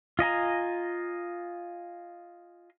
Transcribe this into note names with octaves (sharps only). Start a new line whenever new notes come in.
F4 D#5 G#5 A#5